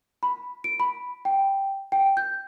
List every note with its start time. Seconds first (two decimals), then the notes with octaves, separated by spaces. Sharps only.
0.23 B5
0.64 D7
0.80 B5
1.25 G5
1.92 G5
2.17 G6